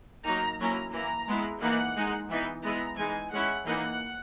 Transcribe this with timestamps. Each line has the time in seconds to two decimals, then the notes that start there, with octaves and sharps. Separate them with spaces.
0.25 F#3 A#3 D#4 A#5
0.59 F#3 A#3 C#4 E4 A#5
0.93 E3 A#3 E4 A#5
1.27 G#3 B3 E4
1.61 E3 A#3 D#4 F#5
1.96 G#3 D#4
2.29 E3 B3 D#4
2.64 G#3 B3 E4 A#5
2.98 E3 G#3 D#4 G#5
3.32 G#3 C#4 E4 F#5
3.66 E3 A#3 D#4 F#5